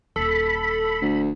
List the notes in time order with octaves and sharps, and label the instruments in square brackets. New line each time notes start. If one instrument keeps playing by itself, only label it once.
[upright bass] D#1 [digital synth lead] A4 [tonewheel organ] B5
[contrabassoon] D2